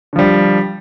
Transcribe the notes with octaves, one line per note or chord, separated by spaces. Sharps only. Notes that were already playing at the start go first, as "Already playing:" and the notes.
D3 F3 G3